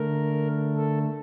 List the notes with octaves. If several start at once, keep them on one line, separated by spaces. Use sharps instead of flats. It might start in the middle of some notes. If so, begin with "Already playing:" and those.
Already playing: D3 A3 A#4
A4